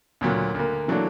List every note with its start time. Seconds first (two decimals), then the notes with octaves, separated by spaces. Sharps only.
0.21 D2 A#2 F#3
0.55 D2 A#3
0.88 E3 F#3 A3 A#3 D4